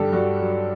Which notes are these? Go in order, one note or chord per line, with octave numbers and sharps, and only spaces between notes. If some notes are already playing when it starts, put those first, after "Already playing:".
Already playing: G2 D3 G4 A4
G2 F#4
F#3